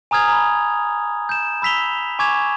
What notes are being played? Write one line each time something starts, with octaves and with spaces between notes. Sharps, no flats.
G#5 A#5 D#6 F6 G#6 F7
A#5 B5
G6 E7
B5 E6 B6 F7 G7
G#5 C#6 D6 G#6 E7 F7